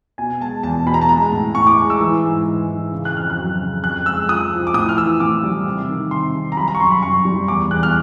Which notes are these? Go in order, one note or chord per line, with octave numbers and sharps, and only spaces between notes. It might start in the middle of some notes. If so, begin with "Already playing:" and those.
B2 G#5
G#3 A5
E2 A5
B2 B5
A#5
A5
G#3 A#5
A2
A2 C#6
D6
G#3
E6
E3
G#2
E3
E3
C#3
F#6
F2 F6
F#6
F#3
C#3
F2 F#6
G#3 E6
F3 D#6
F3
D6
A2 D#6
F6
E3 E6
A2 D6
G3
C3
D#3
C3 C6
C3
A#5
G3 B5
A#5
C#6
F#2 C6
B5
F#2 C#6
G3
E2 D6
E2 F#6
F6